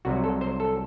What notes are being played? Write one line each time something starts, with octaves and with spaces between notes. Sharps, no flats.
C2 C3 F#3 F#4
A4
C5
A4